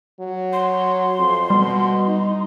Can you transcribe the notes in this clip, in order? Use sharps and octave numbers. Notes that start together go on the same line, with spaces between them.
F#3
C6
F2
B2 G3
D#4